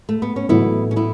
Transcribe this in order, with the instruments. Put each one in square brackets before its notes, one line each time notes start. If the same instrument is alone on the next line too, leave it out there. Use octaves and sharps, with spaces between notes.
[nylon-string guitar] A3
B3
C#4
[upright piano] A1 A2 F#3 A3 [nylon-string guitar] B3 E4
[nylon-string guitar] C#4
B3 E4